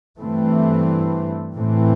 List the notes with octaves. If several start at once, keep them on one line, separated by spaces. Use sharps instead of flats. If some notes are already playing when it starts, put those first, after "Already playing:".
G2 E3 A3 C4
A2 E3 A3 C4